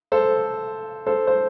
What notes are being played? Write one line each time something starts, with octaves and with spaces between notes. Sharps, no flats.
A4 C5
A4 C5
C5